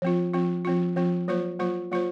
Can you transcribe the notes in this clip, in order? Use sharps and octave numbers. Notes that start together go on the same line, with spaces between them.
F3 C4 F4
F3 C4 F4
F3 C4 F4
F3 C4 F4
F#3 A#3 F4 C5
F#3 A#3 F4 C5
F#3 A#3 F4 C5